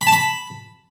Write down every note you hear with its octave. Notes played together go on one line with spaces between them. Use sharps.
B5
A5
B5